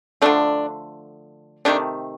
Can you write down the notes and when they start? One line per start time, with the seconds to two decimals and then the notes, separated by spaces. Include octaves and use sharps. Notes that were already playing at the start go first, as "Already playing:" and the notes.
0.22 D3 F3 A3 D4
1.65 C3 D#3 A3 D4